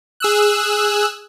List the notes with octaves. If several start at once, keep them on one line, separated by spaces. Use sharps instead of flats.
G#4 E6 F#6